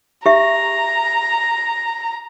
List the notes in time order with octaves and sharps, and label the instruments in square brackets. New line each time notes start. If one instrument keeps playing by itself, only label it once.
[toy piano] G4 E5 [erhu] A#5